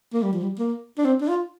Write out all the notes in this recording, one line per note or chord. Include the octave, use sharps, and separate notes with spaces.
A#3
G3
F3
G3
A#3
D4
C4
D4
F4